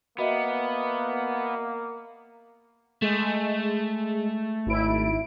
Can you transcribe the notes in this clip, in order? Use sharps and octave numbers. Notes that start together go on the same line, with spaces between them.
A#3 B3 F#4 D#5 E5
G#3 A3
G#1 E4 D7